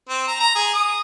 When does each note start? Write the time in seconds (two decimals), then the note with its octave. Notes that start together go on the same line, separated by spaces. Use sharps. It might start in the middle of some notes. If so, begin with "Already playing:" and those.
0.09 C4
0.28 A#5
0.40 A#5
0.56 G#4
0.74 D#6